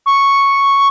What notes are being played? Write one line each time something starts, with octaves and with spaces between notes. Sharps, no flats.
C#6